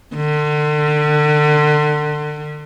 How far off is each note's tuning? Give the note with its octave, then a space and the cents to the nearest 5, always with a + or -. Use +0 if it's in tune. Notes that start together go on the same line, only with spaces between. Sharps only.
D3 +35